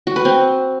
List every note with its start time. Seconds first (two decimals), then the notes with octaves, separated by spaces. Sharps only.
0.07 F#4
0.16 B4
0.25 C4